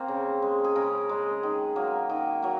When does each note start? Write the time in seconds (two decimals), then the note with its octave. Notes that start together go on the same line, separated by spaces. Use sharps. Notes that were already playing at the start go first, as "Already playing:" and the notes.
Already playing: A#3 C4
0.08 C#3
0.42 G#3
0.64 G#4
0.75 C#3 A#4
1.09 G#3
1.43 D#3
1.76 F#3 A#3
2.09 D#3
2.43 F#3 A#3